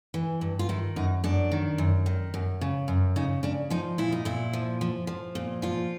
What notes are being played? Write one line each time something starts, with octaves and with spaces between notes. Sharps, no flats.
E3
G2
F4
D#3 E4
F#2 D#4
F#2 D4
D#3
F#2
D#3
F#2
C#3
F#2
C#3 D#4
C#3 D4
F3 D#4
A#2 E4
D#4
A#2 E4
F3
F3
F3
A#2
F3 F4